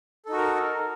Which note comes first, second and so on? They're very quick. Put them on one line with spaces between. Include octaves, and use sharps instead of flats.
A4 D#4 F#4 A#4